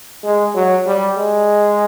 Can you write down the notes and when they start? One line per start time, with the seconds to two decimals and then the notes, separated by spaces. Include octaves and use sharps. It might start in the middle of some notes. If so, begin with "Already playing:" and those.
0.24 G#3
0.55 F#3
0.87 G3
1.17 G#3